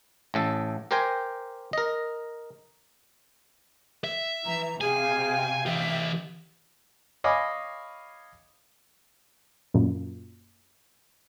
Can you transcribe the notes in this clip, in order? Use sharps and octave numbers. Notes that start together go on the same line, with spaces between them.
A1 A2 A4
G4 A#4 C5 G5 G#5
A#4 D#5
E5
E3 A#5
C3 G#4 F5 G5 G#5
E3 G4 E5
C#5 D#5 F5 G#5 B5 D6
F#2 A#2